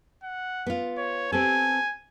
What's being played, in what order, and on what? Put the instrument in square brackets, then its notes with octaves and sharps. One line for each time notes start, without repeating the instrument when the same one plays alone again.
[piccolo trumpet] F#5
[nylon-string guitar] B3 F4
[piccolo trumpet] C#5
[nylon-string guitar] C4 G4 A4 [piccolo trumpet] G#5